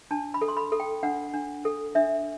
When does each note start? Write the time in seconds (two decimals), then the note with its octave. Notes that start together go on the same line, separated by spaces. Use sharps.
0.11 D4 A5
0.34 B5
0.41 A4
0.48 C6
0.57 B5
0.72 A4
0.80 G5
1.03 D4 F#5
1.34 D4
1.65 A4
1.95 D4 E5